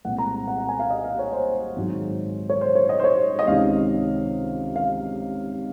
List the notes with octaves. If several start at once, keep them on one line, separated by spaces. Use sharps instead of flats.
C2 A#2 G#3 C4 F#5
A#5
F#5
F#5
G#5
F5
D#5
F5
C#5
C5
G#1 G#2 F#3
C#5
C5
C#5
D#5
C5
C#5
D#5
C#2 C3 D#3 F5
F5